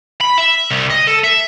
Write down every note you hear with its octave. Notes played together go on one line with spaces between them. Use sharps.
B5
E5
C2
D#5
A4
E5